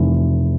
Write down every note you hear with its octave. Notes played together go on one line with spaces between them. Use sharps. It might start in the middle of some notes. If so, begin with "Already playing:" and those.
Already playing: F1 E3